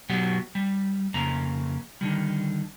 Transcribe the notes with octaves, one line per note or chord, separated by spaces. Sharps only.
B2 F#3 B3 F#4 G4
G3
F2 C#3 A#3 A#5
D3 D#3 G3